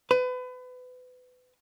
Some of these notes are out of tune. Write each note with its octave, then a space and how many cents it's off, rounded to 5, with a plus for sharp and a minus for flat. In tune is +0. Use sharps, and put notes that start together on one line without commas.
B4 +30